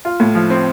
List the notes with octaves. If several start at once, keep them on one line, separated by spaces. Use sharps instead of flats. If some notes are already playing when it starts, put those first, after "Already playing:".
F4
A2
F3
C4